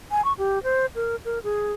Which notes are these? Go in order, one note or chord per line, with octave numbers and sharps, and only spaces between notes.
G#5
C#6
G4
C5
A#4
A#4
G#4